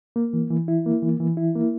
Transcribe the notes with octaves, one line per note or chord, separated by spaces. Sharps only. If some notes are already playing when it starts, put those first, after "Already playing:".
A#3
E3
E3
E4
A#3
E3
E3
E4
A#3